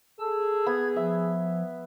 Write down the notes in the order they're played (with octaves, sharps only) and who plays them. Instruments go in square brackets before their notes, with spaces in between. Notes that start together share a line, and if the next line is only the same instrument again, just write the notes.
[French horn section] G#4 [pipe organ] A4 A5 E6
[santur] B3 [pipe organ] G#6
[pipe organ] F3 [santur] E5